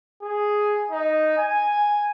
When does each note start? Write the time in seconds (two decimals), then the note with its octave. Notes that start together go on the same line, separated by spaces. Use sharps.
0.22 G#4
0.91 D#4
1.37 G#5